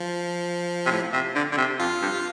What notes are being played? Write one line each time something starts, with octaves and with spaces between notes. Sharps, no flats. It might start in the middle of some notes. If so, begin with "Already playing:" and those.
Already playing: F3
C3
A2
C3
D3
D3
C3
F2 F4
G2